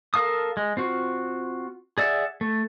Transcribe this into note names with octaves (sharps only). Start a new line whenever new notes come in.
A4 A#4 F5 A5 D#6
G#3
C4 F4 F#4
G#4 D5 E5 F#5
A3